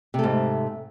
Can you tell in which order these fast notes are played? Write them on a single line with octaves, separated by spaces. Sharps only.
C3 A3 G#2